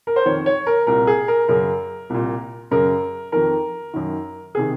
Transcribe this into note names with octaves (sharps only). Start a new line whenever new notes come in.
A#4
C5
F2 D#3 C#5
C#5
A#4
C2 A#2 A#4
G#4
A#4
F#2 C#3 A#4
C2 A#2
F#2 C#3 A#4
F2 D#3 A#4
F#2 D#3
C3 D#3 G#4